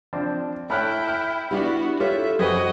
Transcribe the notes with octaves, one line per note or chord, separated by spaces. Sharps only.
F3 C4 D4
A3 E4 C#5 G5 B5 F6 F#6
B5 F6
B3 D4 E4 F#4 G4
F4 G4 A4 B4 C#5 E5
F#2 F#4 G#4 B4 C5 D#5 F#5 G5